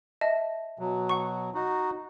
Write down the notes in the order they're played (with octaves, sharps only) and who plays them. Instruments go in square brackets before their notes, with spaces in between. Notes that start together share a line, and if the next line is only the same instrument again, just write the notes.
[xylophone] D#5 E5 A5
[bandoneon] B2 F#3
[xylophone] F#5 C#6
[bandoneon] D#4 F#4